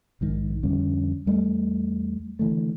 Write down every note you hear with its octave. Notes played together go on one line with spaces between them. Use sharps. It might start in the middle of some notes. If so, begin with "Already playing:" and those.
A#1 G#2 D#3
F2 D3 G3 C#4
E2 G3 A3
D3 E3 A3